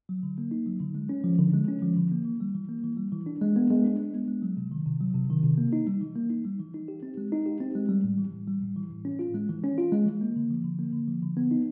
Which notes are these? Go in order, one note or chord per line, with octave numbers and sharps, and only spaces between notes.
F#3
D3
A#3
D#4
F#3
D3
G#3
C#4
F3
D3
G#3
C#4
F3
D3
A#3
E3
G3
E3
A#3
E3
G3
E3
D4
G#3
B3
G#3
D4
G#3
B3
G#3
F#3
C3
D#3
C3
F#3
C3
D#3
C3
A#3
D#4
G3
E3
A#3
D#4
G3
E3
D#4
G4
C4
G#3
D#4
G4
C4
G#3
G3
A2
E3
A2
G3
A2
E3
A2
C#4
F4
G#3
E3
C#4
F4
G#3
E3
A#3
D3
F3
D3
A#3
D3
F3
D3
B3
D#4